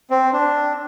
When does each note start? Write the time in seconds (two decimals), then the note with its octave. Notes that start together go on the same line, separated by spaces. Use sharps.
0.10 C4
0.33 D4